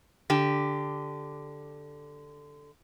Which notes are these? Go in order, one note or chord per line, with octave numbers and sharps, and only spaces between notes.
D3 G4